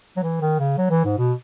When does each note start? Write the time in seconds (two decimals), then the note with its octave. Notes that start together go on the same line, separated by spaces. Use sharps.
0.17 F#3
0.23 E3
0.41 D#3
0.59 C#3
0.78 F#3
0.91 E3
1.05 G#2
1.18 B2